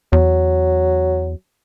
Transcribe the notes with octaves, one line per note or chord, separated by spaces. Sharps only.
E2 F#3